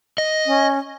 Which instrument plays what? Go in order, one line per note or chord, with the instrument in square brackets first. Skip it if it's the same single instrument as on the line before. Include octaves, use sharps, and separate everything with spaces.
[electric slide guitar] D#5
[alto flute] C#4